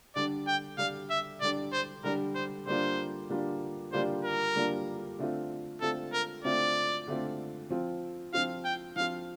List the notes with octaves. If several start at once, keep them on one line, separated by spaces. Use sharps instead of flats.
D3 G3 D4 D5
G5
D3 G3 D4 F5
E5
D3 G3 D4 D5
C5
D3 G3 D4 A#4
C5
D3 G3 A#3 D4 F4 C5
D3 G3 A#3 D4 F4
D3 G3 A#3 D4 F4 C5
A#4
D3 G3 A#3 D4 F4
D3 A3 C4 F4
D3 A3 C4 F4 A4
A#4
D3 A3 C4 F4 D5
D3 A3 C4 F4
F3 C4 F4
F3 C4 F4 F5
G5
F3 C4 F4 F5